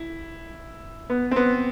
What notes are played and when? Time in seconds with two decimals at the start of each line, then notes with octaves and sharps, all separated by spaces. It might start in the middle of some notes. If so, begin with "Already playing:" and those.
Already playing: E4
1.10 B3
1.31 C4
1.36 B3